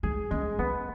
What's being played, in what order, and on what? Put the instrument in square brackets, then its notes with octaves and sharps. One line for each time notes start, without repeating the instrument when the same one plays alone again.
[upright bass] G#3 [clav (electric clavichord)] G#4
[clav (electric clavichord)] G#3 [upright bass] C#4
[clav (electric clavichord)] B3 [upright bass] C#4